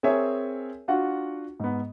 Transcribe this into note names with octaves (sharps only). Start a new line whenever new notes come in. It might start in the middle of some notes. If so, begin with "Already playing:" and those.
C4 G#4 A#4 C#5 E5 G#5
D4 F4 F#4 F#5
G#2 B3